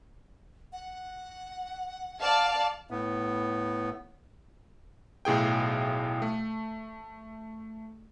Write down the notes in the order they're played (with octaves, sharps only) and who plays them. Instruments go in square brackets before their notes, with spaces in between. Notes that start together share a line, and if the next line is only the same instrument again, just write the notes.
[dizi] F#5
[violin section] D5 F5 A5
[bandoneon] A2 B3
[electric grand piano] B1 A2 G#4 G5
A3